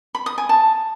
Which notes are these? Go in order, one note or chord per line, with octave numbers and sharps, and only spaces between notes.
B5
D#6
G#5
A5